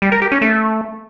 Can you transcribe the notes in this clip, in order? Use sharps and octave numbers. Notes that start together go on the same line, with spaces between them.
G3
A#4
G4
C#4
A3